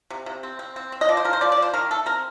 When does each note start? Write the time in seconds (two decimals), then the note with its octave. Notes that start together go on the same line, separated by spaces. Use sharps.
0.10 C3
0.26 C3
0.43 C4
0.59 C4
0.76 C4
0.92 C4
1.01 D#5
1.09 F3 D5
1.17 C5
1.25 F3 A#4
1.33 C5
1.41 F3 D5
1.52 D5
1.57 F3
1.62 C5
1.74 D#3 A#4
1.91 A3 A4
2.06 C4 A#4